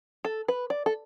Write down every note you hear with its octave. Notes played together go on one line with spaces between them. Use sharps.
A4
B4
D5
A4